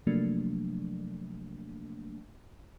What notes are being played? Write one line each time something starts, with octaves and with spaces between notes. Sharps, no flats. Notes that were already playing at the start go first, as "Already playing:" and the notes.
C3 F3 F#3 A3 A#3 D4